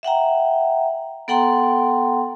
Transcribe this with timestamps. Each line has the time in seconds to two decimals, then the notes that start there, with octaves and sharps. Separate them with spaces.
0.03 E5 F#5 G5 A#5
1.28 B3 A4 F#5 G5 A#5 C6